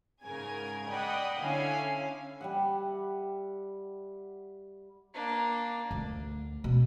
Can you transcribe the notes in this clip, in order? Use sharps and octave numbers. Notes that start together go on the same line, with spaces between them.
G#2 C#3 G#4 A#4 G#5 G#6
D5 D#5 F#5 G5 B5 D#6
D3 C#4 E4 F5 G#5
G3 E5 F#5
A#3 D4
D2
B2